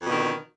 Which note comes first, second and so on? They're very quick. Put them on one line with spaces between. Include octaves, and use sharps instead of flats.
F2 B2 D3 D#3